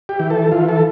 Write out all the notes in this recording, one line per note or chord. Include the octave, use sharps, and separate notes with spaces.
G4
E3
A4
E3 F4
A4